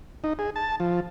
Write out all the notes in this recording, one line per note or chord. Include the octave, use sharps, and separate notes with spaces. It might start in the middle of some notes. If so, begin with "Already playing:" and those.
D#4
G#4
A5
F3